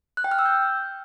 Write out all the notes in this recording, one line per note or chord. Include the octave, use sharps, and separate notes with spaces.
F#6
G5
F6
E6
G6